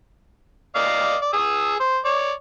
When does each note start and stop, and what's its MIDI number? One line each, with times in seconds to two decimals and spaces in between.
0.75 1.16 74
0.75 1.16 75
0.75 1.16 77
1.22 1.29 74
1.33 1.76 68
1.33 1.76 87
1.33 1.76 88
1.80 1.98 72
2.05 2.32 73
2.05 2.32 74